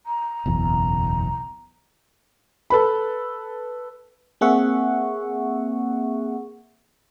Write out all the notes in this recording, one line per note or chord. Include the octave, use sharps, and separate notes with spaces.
A#5
F#1 B1 E2
A4 B4 B5
A#3 C4 G#4 E5 F#5 C#6